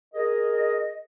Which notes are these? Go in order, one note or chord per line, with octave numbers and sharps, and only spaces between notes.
G#4 A#4 D#5